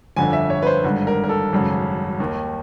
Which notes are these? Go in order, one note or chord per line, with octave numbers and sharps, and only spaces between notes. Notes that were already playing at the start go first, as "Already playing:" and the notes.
G1 F2 D3 G#5
E5
C#5
B4
C5
G#1 G2 D3
A#4
A#4
A4
G#1 F#2 C#3
D#2 D#3